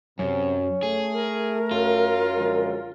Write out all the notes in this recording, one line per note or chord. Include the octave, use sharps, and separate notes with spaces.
F#2 C3 C#4
A3 G#4
A#4
F#2 F4
D3 F3 G#3